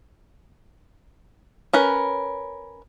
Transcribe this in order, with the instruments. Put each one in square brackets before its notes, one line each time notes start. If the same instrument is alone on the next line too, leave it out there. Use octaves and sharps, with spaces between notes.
[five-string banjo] C#4 A#4 B4